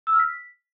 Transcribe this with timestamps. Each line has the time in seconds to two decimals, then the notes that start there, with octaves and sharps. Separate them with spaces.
0.07 E6
0.13 F6
0.19 B6